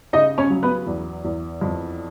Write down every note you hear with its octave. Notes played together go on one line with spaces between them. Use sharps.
C#3 D#4 D#5
C#4 C#5
F#3
B3 B4
E2
E2
F2